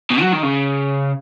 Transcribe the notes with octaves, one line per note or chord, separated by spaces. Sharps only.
B2
F#3
D#3
C#3